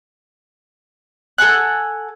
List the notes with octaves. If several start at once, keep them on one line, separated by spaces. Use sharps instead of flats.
A4 F#5 G#5 F#6